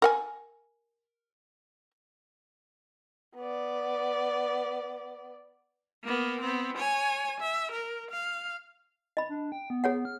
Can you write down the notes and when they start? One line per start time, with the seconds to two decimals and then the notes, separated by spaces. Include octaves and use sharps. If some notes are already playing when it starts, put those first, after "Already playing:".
0.02 A#4 F#5 G#5
3.36 B3 D5
6.04 A#3 B3
6.41 B3 C4
6.77 C#5 G#5
7.40 E5
7.71 A#4
8.10 F5
9.17 D#5 B5
9.29 D4
9.52 G5
9.70 B3
9.84 G#4 C#5 F#5
10.05 F6